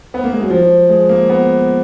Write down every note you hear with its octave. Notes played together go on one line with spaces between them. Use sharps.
B3
A#3
G#3
F#3
F3
G#3
A#3
B3